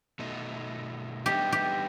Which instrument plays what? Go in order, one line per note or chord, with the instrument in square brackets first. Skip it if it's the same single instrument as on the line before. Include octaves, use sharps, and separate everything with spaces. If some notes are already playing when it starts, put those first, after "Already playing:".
[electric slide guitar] B2 A3 D#4
[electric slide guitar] G3 B3 D#4 [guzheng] G4
[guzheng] G4